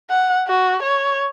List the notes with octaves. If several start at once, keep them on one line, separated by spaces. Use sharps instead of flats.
F#5
F#4
C#5